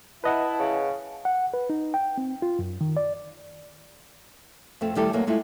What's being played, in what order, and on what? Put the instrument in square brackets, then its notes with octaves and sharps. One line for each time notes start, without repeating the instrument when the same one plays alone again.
[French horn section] E4 [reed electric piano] B4 D#5 F#5 [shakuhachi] A5
[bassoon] C#3
[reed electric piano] F#5
B4
D#4
G5
C4
F4
F#2
D#3
D5
[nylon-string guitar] F2 A3 C4
D#3 G3 A3 E4 G4 A4
E2 F#3 A3 A#3 A#4
G#3 A3 E4 F4